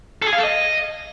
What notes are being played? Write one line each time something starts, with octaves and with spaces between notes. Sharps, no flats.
A4
G#4
F5
A4
D#5